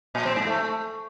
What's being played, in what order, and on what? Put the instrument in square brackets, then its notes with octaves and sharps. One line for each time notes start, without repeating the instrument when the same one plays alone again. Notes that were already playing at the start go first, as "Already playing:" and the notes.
[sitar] A#2
C4
G#2
A3